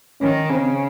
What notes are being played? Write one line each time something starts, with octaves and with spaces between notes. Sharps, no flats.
D#3 C#4
C#3 C4